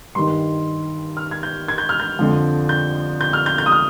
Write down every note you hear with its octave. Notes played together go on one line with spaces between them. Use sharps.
G2 D#3 C6
F6
G#6
G6
G#6
G6
F6
G6
F2 D3 F3
G6
G6
F6
G6
G6
D#6
F6